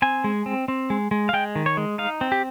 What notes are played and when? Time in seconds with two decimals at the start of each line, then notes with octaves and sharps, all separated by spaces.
0.02 C4 G#5
0.24 G#3
0.46 C4
0.68 C4
0.90 G#3
1.11 G#3
1.29 F5
1.33 G#3 G5
1.56 D#3
1.66 C#5
1.77 G#3
1.98 D#4 F5
2.21 C4
2.32 G4